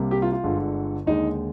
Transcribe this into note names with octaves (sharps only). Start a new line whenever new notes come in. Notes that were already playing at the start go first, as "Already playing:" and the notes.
Already playing: C2 C3 G3 A#3
G4
F4
F4
G1 G2 D3 G#3
D#2 D3 G#3 D#4